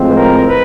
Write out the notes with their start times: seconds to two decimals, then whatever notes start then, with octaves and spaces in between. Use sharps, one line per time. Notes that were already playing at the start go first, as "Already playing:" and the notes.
Already playing: A2 F3 G#3 C4
0.08 B4
0.15 A#4
0.48 B4